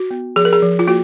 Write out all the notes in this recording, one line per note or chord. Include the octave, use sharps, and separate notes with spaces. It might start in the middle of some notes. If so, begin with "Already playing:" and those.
Already playing: F#4
B3
F3 G#4
A#4
G#4
F3
F4
A#3 F#4